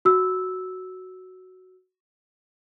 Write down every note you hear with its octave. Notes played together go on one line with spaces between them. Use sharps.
F#4 E6